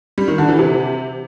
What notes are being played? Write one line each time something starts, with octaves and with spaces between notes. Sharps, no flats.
G3
D#3
D3
E3
C3